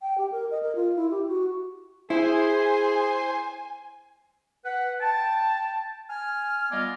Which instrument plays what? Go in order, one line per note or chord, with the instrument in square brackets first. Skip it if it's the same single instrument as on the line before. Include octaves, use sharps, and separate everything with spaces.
[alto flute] G5
G4
A#4
D#5
A#4
F4
E4
G4
F#4
[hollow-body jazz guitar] E4 [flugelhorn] G#4 [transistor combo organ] C5 [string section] G#5
[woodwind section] B4 F#5
G5 A5
G#5 F6
G3 B3 F4 D5 D#5